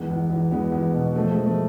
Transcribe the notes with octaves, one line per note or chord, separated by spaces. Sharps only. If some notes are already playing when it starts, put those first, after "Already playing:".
Already playing: A1 E2 G#3 B3
E2
E2
E2 G#3 B3
E2
B2
F3 A3
F3 G#3
A3